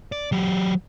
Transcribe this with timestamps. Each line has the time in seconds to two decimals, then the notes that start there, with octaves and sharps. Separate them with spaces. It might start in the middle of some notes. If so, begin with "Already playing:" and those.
0.12 D5
0.32 F#3 G4